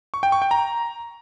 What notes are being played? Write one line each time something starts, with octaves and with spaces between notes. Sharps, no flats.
C#6
G5
C#6
G5
A#5